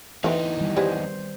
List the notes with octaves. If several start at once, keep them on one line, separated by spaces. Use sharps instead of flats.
E2 E3 A3 B3 C4 D#4
D#3 G3
G3 B3 G#4 C5